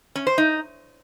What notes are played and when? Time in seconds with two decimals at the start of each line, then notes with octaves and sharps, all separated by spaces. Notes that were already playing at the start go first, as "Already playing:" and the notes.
0.16 C#4
0.27 C5
0.38 D#4